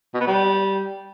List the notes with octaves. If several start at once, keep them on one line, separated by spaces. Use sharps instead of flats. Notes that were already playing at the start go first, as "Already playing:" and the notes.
B2
B3
G3